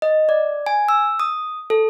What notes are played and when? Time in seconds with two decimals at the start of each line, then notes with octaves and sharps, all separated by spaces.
0.02 D#5
0.29 D5
0.66 G#5
0.89 E6
1.20 D#6
1.70 A4